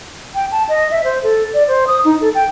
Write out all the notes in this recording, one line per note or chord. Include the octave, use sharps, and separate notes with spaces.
G5
A5
D#5
E5
C5
A4
D5
C5
D#6
D#4
A4
G5